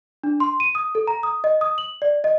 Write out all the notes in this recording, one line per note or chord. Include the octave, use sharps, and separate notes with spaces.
D4
C6
D#7
D#6
A4
A#5
D#6
D#5
D#6
F#7
D5
D#5